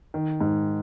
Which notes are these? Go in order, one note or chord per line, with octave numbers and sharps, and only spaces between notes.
D#3
G#2